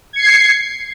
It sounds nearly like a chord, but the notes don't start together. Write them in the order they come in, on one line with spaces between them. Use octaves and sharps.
G#6 C#7 C7